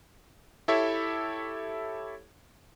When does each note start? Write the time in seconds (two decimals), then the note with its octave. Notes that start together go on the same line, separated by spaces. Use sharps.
0.68 E4 G4 A4 C#5 E5